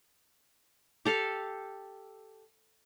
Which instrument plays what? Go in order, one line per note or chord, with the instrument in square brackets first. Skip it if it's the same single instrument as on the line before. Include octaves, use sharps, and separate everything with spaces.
[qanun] G4 A4 F5